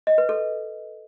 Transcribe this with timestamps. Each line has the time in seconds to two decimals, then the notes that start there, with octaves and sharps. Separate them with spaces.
0.07 D#5
0.18 B4
0.29 A4